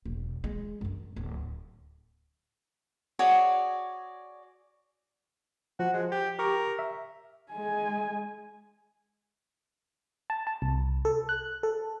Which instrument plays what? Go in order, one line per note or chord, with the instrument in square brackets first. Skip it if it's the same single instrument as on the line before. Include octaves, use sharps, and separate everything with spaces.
[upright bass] E1
G#3
F#2 D4
D1
[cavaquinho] F#4 G#4 C#5 D5
[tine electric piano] F3 [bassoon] F#4
[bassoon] G#3
G4
[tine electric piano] G4 C#6 [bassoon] A#4
[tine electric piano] E5
[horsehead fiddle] G#3 G#5
[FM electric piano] A5
A5
C2
A4
F#6
A4